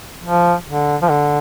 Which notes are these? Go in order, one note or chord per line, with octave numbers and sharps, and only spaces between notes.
F3
D3
F3
D3